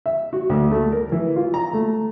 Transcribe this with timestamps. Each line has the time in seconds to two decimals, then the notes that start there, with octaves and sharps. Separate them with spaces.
0.06 E5
0.33 F#4
0.50 D2
0.71 A3
0.92 A#4
1.12 E3
1.36 F4
1.54 A#5
1.73 A3